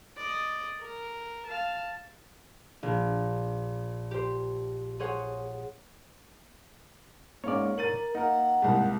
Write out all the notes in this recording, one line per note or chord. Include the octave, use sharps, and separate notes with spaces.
D5 D#5
A#4
F5 A5
A#1
G4 C5
G#4 C5 C#5 F#5
G#2 A#3 C#4 C#5 D5
A#4 A6 D#7 F#7
A#3 D#4 A#4 F#5
C2 G#2 A#3